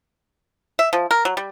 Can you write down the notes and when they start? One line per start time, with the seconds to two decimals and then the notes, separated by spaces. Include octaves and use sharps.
0.79 E5
0.93 F3
1.11 A#4
1.25 F#3
1.37 G3